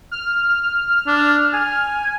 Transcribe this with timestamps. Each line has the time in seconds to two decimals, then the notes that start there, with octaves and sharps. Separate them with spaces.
0.11 F6
1.07 D4
1.53 G#5